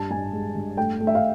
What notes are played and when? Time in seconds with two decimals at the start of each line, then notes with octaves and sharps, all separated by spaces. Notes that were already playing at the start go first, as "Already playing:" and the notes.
Already playing: G2 A5
0.11 G2 G#5
0.33 G#3
0.55 G2
0.77 A3 G5
1.01 A3
1.07 E5
1.15 F5